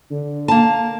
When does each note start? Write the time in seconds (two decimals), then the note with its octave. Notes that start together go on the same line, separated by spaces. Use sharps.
0.11 D3
0.48 A#3 A5